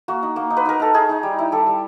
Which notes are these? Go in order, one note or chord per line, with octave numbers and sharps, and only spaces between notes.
A#3 F#4
D#4
A#3
D#4
B4
D#4 A#4
D#4 A4
D#4 G#4
D#4
G3
E4
G3 A4
G3